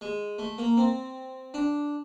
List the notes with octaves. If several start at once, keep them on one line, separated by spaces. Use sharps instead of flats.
G#3
A3
A#3
C4
D4